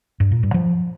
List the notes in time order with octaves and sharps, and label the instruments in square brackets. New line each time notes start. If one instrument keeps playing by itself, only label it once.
[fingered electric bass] G2
A#2
G2
F3